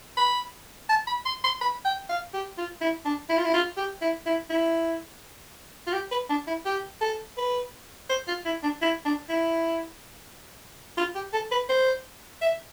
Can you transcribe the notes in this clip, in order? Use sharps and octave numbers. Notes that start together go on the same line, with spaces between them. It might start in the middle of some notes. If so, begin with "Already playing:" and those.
B5
A5
B5
C6
C6
B5
G5
F5
G4
F4
E4
D4
E4
F4
E4
F4
G4
E4
E4
E4
F4
G4
B4
D4
E4
G4
A4
B4
C5
F4
E4
D4
E4
D4
E4
F4
G4
A4
B4
C5
E5